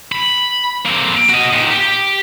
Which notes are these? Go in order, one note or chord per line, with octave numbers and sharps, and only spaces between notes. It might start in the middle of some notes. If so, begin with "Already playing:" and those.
B5
A#3 C4
F#4 D#5
A#2 D#3
G4